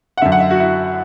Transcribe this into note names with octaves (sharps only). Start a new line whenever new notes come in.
F#5
F#2 D3 E5
F#5
E5
F#4
E4